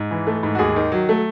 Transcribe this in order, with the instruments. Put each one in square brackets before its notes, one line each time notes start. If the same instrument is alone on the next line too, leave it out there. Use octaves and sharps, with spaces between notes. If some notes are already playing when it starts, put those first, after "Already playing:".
Already playing: [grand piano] G#2
E3
A3
G#2
F#4
D#2 G#4
D#3
F#3
A3